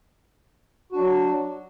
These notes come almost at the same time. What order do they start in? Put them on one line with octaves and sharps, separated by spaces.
F#4 D4 F#3